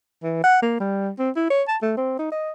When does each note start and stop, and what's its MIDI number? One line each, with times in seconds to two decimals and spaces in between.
0.23 0.42 52
0.44 0.61 78
0.62 0.79 58
0.80 1.10 55
1.19 1.30 60
1.36 1.49 64
1.50 1.63 73
1.68 1.77 81
1.82 1.95 57
1.97 2.15 60
2.19 2.29 63
2.32 2.52 75